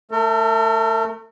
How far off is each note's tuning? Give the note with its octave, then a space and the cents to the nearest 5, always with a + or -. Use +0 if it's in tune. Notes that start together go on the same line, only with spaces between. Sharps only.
A3 +0 A#4 -45